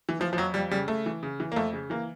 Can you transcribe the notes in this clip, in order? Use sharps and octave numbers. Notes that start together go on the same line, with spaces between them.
E3
E3 F3
F3
F2 F#3
F2 G3
C#3 G3
C#3 A3
E3
C#3
E3
A#3
F2 A3
C#3
E3 A#3